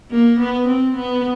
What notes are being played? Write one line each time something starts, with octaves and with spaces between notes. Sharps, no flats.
A#3
B3
C4
B3